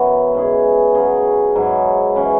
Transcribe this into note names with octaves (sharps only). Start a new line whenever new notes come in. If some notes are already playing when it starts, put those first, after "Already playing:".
Already playing: F#2 E3 B3 F#4
G#2 E3 C#4 G#4
C#3 F#3 C#4 G#4
G#2 F#3 E4
C#3 E3 C#4